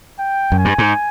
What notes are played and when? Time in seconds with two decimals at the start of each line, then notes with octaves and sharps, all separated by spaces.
0.19 G5
0.52 F#2
0.59 G#5
0.65 G2
0.78 G#2